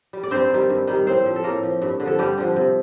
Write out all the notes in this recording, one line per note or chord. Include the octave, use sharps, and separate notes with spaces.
G3
D5
G2 C4 C5
D#3 G3
G2
D#3 G3
A2 C4 C5
F3
A4
A2 A#3 A#4
F3
G2
D3
F3 A4
G2 G3 G4
D3 F3
C3